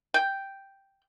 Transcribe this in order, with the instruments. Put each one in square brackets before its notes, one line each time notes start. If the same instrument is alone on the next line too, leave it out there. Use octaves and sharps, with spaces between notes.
[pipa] G5